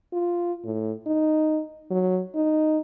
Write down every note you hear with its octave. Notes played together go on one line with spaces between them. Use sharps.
F4
A2
D#4
F#3
D#4